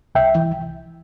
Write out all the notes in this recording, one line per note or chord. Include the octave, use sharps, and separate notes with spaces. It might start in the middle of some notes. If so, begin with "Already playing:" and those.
C2 E5 G5
E3